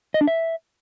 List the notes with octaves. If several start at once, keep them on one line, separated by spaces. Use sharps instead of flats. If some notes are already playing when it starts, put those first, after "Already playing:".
D#5
D4
E5